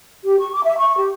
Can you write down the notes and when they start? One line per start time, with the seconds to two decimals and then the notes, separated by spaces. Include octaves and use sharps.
0.24 G4
0.39 C#6
0.53 D6
0.65 E5
0.79 C#6
0.97 G4